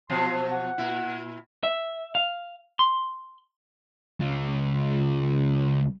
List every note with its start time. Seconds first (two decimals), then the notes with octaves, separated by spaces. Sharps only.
0.10 B2 F3 F#3 C6
0.51 F#5
0.78 A#2 E4
1.63 E5
2.15 F5
2.79 C6
4.20 C#2 F4